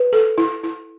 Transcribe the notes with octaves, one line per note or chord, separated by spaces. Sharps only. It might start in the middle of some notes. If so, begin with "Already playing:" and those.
Already playing: B4
A4
E4
E4